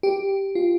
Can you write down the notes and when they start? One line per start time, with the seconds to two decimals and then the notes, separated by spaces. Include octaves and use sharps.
0.03 G4
0.55 F4